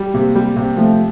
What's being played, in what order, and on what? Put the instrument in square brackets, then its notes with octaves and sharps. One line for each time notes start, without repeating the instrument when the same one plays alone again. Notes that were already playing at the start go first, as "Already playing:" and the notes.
Already playing: [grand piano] G3
[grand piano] C3 [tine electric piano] A#3
[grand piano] G3
C3
[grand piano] F3 [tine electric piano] A3